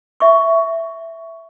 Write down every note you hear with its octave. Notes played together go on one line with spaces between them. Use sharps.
E5 C#6